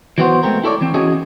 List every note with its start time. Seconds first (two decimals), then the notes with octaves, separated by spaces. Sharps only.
0.18 E3 F#3 B3 F#4 C5
0.43 G#3 A3 C4 A#4
0.64 E4 A4 C#5 D5
0.81 E3 C4
0.94 E3 C#4 F#4 G#4 C#5 D#5